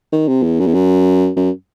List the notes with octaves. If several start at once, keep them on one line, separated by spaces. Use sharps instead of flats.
D#3
C3
E2
F#2
E2
F#2
F#2